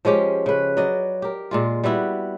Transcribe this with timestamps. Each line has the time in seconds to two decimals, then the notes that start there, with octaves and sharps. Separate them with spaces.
0.05 F3 G#3 C#4 G4
0.46 C#3 B4
0.77 F#3 D5 D#5
1.22 G4 A#4
1.51 A#2 G#3 F4
1.84 G3 B3 E4 F#4